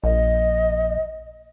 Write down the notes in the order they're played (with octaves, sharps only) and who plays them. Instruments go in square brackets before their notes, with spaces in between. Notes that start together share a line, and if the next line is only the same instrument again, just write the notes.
[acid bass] A#1 [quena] D#5